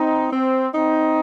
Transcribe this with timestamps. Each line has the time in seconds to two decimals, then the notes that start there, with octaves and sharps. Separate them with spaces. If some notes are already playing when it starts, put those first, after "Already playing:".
Already playing: C4 D#4
0.32 C4
0.74 C4 D#4